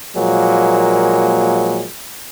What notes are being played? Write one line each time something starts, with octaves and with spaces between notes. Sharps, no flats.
A#2 F3 F#3 G#3 A#3